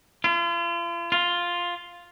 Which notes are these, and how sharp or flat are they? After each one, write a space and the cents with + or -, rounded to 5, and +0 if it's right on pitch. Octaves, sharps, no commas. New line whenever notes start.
F4 -40
F4 +5